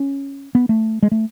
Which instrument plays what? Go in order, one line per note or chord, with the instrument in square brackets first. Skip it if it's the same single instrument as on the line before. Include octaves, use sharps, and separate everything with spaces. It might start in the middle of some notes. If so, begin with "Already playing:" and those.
Already playing: [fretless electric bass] C#4
B3
A3
G#3
A3